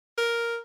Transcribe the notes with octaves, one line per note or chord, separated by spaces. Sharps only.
A#4